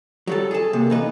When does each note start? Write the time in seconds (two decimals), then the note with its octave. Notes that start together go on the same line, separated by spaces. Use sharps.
0.27 F#3 G3 A4
0.51 G#4 A4
0.73 C3 A#3
0.90 E2 D#4 B4